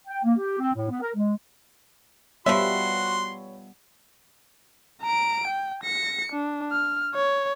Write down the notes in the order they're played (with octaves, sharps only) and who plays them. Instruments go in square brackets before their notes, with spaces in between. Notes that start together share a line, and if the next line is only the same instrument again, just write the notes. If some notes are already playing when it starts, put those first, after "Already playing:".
[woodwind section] G5
A#3
G4
C4
A2
B3
A#4
G#3
[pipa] F3 E5 [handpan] G3 B3 [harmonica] F#4 C6 [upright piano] C#5 B5
[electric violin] A#5 D7
G5
A#6 C#7
D4
F6
C#5